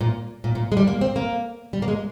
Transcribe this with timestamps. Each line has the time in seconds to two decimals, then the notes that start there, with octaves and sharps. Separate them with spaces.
0.01 A#2
0.44 A#2
0.55 A#2
0.72 G#3
0.77 G3
0.87 A#3
1.01 C4
1.16 A#3
1.73 G3
1.82 A#3
1.88 G#3